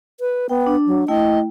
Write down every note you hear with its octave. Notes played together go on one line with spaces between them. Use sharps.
B4
B3 G5
D4
F#3
A3 E4 D#5 G5